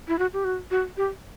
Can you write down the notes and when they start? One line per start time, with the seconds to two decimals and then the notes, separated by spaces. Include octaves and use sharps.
0.08 E4
0.19 F#4
0.33 G4
0.44 F#4
0.71 F#4
0.97 G4